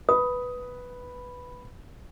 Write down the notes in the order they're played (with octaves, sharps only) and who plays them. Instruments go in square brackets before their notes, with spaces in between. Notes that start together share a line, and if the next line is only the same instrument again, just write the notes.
[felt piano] B4 [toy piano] D#6